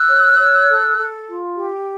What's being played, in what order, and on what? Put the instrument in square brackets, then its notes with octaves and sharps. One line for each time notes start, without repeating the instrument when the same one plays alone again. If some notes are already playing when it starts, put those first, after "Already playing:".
Already playing: [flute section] E6 F#6
C#5
C#5
A4
A4
F4
G4